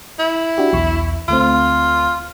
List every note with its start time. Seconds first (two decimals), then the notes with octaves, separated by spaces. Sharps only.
0.19 E4
0.58 D4 F#4 G4
0.73 B1 E2 C#6
1.28 D2 A3 C4 F4